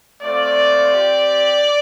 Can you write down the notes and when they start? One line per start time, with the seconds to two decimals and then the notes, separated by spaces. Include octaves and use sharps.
0.22 A3 C4 F4 D5
0.92 C4 G4